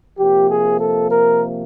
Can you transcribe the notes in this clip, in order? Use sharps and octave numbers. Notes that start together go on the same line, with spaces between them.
C3 F3 A#3 G4
G#4
A4
A#4